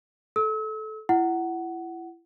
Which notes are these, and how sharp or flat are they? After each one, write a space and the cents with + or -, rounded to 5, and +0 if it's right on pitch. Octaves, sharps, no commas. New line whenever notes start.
A4 -15 E6 -40
E4 +30 F#5 +15